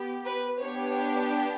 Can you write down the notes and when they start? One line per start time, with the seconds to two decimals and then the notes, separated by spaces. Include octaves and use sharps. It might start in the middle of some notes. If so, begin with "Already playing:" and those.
Already playing: B3 G4
0.25 B4
0.63 B3 D4 G4 C#5